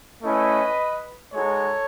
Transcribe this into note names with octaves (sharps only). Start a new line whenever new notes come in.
A3 C#4 E4 B4 D#5
G#3 D#4 F#4 A4 C#5